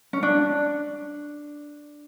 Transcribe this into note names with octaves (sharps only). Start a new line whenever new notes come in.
C#4
D4